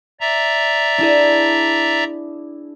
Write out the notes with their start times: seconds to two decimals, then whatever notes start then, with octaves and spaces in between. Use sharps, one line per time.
0.20 D5 E5 A#5
0.98 D4 E4 G#4